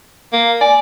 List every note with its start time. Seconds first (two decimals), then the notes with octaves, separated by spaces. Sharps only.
0.33 A#3
0.61 D5 G#5